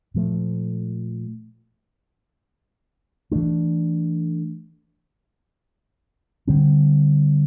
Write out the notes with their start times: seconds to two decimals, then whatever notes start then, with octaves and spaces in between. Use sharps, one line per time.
0.14 A#2 F3 A3
3.32 E3 A3 D4
6.47 D3 G3 C4